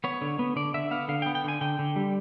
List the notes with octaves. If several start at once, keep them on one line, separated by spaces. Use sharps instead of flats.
B3 C#5
D3
B3
D3 D5
D3 E5
B3 F5
D3 F5
G5
B3
G5
D3 G#5
D3 G5
D3
G3